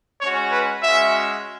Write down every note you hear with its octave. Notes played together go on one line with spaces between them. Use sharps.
G#3 C#4 F#4 C#5
B4
G#3 C#4 F#4 E5